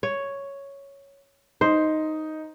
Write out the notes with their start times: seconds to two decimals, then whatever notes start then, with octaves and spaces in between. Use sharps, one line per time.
0.03 C#5
1.61 D#4 C5